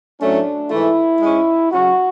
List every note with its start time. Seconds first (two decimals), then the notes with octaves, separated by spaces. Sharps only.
0.20 A2 F#3 A3 C#4 D4
0.71 G#2 E3 A3 E4
1.21 G#2 G#3 C#4
1.72 C#3 F#3 C#4 F#4